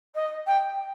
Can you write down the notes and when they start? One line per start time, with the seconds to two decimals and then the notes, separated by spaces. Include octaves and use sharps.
0.15 D#5
0.47 G5